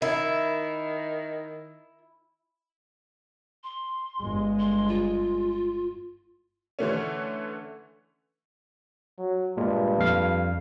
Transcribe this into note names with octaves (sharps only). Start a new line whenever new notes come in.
D#3 E4
C6
G1 G#3
C6
F4
D3 E3 A3 C#4
F#3
G2 A#2 G#3
F2 F5